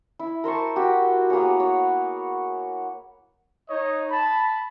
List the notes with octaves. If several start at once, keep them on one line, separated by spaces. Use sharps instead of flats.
E4
A#4 C5 A5 C#6
F#4 G4
A#3 B3 G#4 C#5
C#5
D#4 C#5 D#5
A5 B5